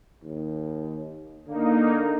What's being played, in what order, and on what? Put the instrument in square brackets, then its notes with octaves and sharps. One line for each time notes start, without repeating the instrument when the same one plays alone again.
[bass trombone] D#2
[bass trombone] D3 [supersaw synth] A#3 D#4